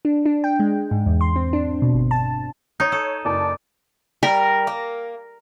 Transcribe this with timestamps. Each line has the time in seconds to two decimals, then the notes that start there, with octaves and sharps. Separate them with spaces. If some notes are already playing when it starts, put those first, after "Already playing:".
0.05 D4
0.26 D4
0.44 G5
0.60 G#3
0.91 G#2
1.06 E2
1.21 C6
1.36 C4
1.53 D4
1.82 B2
1.94 G1
2.11 A5
2.80 D#4 C#5 D#6 G6
2.92 A4
3.25 F#1 D5 A5
4.23 G3 A#4
4.67 A#3